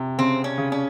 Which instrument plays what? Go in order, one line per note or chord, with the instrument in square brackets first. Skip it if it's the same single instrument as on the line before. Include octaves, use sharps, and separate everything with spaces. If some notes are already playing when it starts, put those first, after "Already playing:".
Already playing: [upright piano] C3
[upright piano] C#3 [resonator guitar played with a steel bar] C4
[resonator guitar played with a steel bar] C#4
[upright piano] C#3
[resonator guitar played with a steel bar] C#4